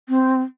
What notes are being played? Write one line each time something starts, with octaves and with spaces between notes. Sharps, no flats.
C4